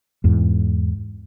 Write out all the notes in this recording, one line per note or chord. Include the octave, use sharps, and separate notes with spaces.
E2 G#2